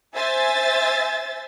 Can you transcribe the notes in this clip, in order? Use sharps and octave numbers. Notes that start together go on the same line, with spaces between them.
C5 E5 G#5 A6